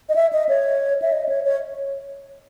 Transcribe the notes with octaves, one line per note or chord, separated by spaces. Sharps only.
D#5
E5
D#5
C#5
E5
D#5
C#5
C#5